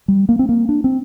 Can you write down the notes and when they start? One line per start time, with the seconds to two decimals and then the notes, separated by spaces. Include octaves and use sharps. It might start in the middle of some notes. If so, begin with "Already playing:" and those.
0.08 G3
0.29 A#3
0.39 C4
0.49 A#3
0.69 D4
0.84 C4